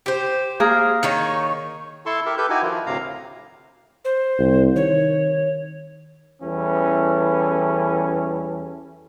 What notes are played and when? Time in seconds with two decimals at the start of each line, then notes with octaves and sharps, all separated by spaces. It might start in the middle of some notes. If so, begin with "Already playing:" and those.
0.06 G4 C5
0.60 A#3 G#4 A#4
1.03 D#3 D#4 C#5
2.06 E4 A4 A5 C6 C#6
2.26 G4 A#4 E5
2.38 G4 A4 B4 G6
2.50 D#4 E4 F#4 G4 G#5
2.62 D#3 F3 F4
2.86 D2 A2 C3 F5 A#5
4.05 C5
4.39 C2
4.76 D#3 C#5
6.42 E2 E3 G3 C#4 A4